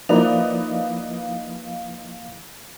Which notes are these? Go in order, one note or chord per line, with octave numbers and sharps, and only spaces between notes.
F3 A#3 D#4 E4 B4 D5 F5